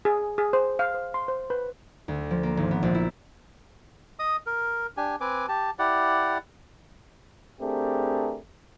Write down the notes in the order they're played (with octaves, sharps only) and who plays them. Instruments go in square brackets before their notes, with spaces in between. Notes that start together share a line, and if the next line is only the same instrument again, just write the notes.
[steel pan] G#4
G#4
C5
F5
C5
C6
C5
B4
[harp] D2
F3
A#3
G#1
B3
A#1
E4
[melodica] D#5 D#6
A#4
D4 G4 G#5
C4 B4 G#5 D6
G4 A5
E4 G4 D5 F#5
[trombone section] A3 C4 D4 G4 G#4 A#4